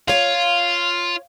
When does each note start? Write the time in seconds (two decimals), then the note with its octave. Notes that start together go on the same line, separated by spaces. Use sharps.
0.08 F4 C#5 F5